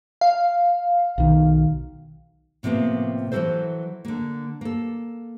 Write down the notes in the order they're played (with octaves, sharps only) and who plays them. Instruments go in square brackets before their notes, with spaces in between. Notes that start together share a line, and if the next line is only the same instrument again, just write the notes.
[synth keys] F5
[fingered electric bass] B1 D#3
[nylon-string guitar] A2 C3 F3 G3 A#3 B3
E3 F#3 G3 F#4 A4 C5
D3 A#3
A#3 A4